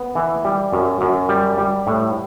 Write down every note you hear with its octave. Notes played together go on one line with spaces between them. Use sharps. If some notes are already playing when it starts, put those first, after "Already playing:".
Already playing: B3
E3
G3
F#2
F#2
G3
G3
A2